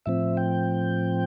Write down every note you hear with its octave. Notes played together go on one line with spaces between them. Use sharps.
A2 F3 C4 E5
G5